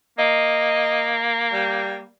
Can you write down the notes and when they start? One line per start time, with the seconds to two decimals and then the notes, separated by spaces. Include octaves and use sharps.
0.18 A#3 D#5
1.52 G3